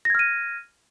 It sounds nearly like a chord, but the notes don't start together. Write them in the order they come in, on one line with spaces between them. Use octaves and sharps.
A#6 G#6 F6 D#7